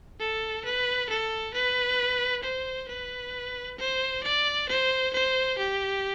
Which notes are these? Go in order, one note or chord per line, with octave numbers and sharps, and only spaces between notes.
A4
B4
A4
B4
C5
B4
C5
D5
C5
C5
G4